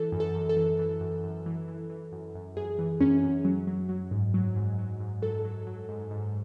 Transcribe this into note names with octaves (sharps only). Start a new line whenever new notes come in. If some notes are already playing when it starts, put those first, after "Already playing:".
Already playing: E3 A4
F#2
A4
F#2
A4
E3
E3
F#2
F#2
E3
E3
E3
F#2
F#2
F#2 G#4
E3
F#2 C#4
F#2
F#3
F#3
F#3
G#2
F#3
G#2
F#3
G#2
F#3 A4
F#3
F#3
G#2
G#2